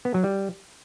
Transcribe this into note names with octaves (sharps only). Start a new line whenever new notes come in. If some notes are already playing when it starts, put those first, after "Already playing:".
B3
F#3
G3